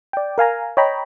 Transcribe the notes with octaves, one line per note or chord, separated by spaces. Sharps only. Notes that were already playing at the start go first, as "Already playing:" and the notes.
D5 G5
A#4 F5 G#5 A#5
C#5 D#5 G5 A#5 B5